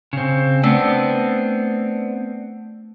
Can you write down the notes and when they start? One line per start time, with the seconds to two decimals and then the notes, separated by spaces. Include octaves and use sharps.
0.13 C#3 C4
0.64 A3 B3 C4 D4